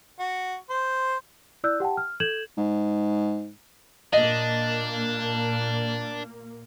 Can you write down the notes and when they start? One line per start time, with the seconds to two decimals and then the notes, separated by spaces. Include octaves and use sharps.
0.20 F#4
0.70 C5
1.64 E4 D5 E6 F#6 G6
1.80 G4 F#5 G5 A5
1.97 F6
2.20 A4 G6 G#6 E7 F#7
2.57 G#2
4.13 A#2 A#3 D4 D#5